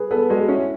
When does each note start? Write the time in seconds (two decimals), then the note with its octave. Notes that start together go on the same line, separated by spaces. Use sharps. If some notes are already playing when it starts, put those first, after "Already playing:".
Already playing: G#4 B4
0.11 B3 A4
0.29 G#3 F#4
0.48 C#4 E4